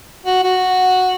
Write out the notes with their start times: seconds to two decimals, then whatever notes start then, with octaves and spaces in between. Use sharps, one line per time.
0.26 F#4
0.43 F#4